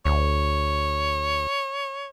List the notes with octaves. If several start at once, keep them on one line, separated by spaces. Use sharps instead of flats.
D2 C#5